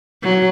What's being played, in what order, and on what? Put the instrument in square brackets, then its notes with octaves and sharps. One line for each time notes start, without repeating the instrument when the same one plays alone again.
[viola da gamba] F#3